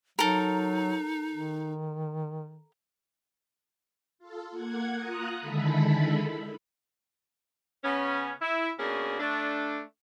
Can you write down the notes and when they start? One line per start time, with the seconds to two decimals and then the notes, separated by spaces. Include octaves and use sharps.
0.19 F#3 D#4 A4 A#4
1.32 D#3
4.19 F4 A4
4.51 A#3 F#5 G#6
4.95 F4 A#5 D#6 F#6
5.40 D3 D#3 G#3 E4 A4 B5
7.84 C#3 B3 C#4
8.41 E4
8.79 B2 A#3 C#4 D4 G#4
9.19 A3 D4